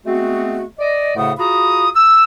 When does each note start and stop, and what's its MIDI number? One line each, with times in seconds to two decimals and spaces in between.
0.06 0.64 56
0.06 0.64 57
0.06 0.64 59
0.06 0.64 60
0.06 0.64 66
0.79 1.16 74
0.79 1.16 75
1.16 1.32 38
1.16 1.32 45
1.16 1.32 49
1.16 1.32 57
1.16 1.32 78
1.16 1.32 87
1.38 1.88 65
1.38 1.88 66
1.38 1.88 68
1.38 1.88 82
1.38 1.88 83
1.38 1.88 87
1.95 2.24 88